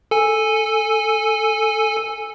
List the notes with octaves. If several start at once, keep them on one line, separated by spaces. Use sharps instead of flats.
A4 G#5